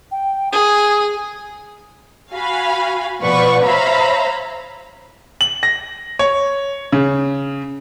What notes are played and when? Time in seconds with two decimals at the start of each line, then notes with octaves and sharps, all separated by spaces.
0.11 G5
0.52 G#4 D#6
2.32 F#4 F5 G#5 B5
3.22 B2 F3 B4 D5 F#5 C#6
3.63 C5 C#5 E5 F5 A#5 B5
5.41 F#7
5.63 A#6
6.19 C#5
6.92 C#3